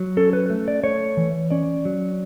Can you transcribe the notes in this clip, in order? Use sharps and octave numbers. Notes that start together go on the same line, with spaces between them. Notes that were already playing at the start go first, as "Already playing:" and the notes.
Already playing: F#3
C#4 A4
B4
A3
D5
A3 C#5
E3
C#4 D5
F#3